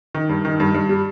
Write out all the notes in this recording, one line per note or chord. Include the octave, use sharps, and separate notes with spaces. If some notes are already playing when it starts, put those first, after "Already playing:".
D#3
G2
D#3
G2
G2
G3